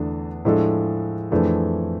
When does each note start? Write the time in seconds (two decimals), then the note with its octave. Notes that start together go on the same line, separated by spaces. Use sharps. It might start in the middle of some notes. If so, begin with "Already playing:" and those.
Already playing: E2 D3 A3 D4 A4
0.45 A2 F3 G#3 D4 A4
1.31 F2 E3 A3 D4 G#4